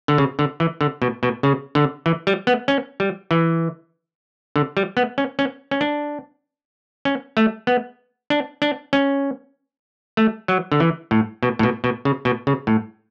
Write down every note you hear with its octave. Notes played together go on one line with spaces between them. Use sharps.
D3
C#3
D3
E3
D3
B2
B2
C#3
D3
E3
G3
B3
C#4
G3
E3
D3
G3
B3
C#4
C#4
C#4
D4
C#4
A3
B3
D4
D4
C#4
A3
F#3
D3
E3
A2
B2
A2
B2
B2
C#3
B2
C#3
A2